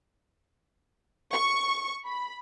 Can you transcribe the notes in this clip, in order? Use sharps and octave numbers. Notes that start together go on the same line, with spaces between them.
C#6
B5